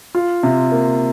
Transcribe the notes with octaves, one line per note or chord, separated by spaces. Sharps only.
F4
C3
A#3